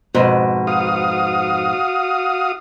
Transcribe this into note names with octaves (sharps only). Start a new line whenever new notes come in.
F2 G#2 B2
F#4 F5 D#6